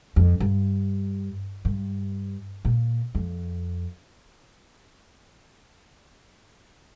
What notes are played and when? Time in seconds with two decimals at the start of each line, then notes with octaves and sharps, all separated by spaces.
0.16 F2
0.40 G2
1.65 G2
2.65 A#2
3.15 F2